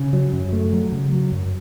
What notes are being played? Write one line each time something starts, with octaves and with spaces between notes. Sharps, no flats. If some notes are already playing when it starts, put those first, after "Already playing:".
Already playing: C#3
F#3
F#2
A3
F#3
C#3
F#3
F#2